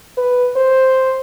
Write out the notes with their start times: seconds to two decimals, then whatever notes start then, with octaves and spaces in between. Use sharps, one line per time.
0.18 B4
0.56 C5